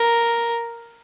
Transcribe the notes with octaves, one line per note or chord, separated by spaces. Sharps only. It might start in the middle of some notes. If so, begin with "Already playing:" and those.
Already playing: A#4